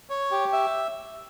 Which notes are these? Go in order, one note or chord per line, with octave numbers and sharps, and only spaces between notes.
C#5
G4
E5